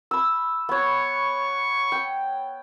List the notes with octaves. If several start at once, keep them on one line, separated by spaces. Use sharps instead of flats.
B5 E6
B3 C#5 C#6
G5